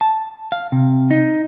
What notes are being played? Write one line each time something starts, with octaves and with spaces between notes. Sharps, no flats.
A5
F5
C3
D#4